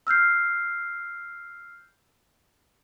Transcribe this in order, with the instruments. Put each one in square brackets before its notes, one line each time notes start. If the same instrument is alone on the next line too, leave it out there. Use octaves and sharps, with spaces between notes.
[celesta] E6 F6 G6 C7